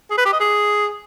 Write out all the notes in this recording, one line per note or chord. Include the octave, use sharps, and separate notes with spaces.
G#4
B4
G4
D#5
G#4